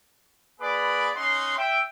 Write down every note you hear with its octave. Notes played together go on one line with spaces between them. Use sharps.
A#3 G#4 B4 D5 B5 D6
C#4 D#4 F#5 C6
E5 G5